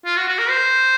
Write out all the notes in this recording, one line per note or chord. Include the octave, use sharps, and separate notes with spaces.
F4
F#4
F#4
A#4
C5